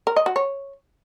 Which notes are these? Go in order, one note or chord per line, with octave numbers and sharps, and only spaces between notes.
A#4
D#5
F#4
C#5